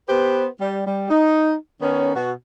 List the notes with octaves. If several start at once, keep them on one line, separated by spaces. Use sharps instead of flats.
B3 G4 B4 C5
G3
G3
D#4
D#3 B3 C#4
B2 F#4